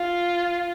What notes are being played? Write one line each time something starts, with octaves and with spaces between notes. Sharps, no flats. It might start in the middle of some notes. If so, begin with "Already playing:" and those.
Already playing: F4